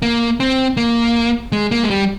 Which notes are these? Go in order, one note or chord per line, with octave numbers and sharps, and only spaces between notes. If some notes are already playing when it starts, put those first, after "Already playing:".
A#3
C4
A#3
G#3
A#3
G#3
G3